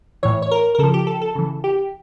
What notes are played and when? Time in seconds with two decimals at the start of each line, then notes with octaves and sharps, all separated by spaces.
0.23 A2 E3 C#5
0.42 C#5
0.51 A#4
0.75 A#4
0.79 C#3 F3 A4
0.94 G4
1.07 A4
1.22 A4
1.35 C#3 E3
1.64 G4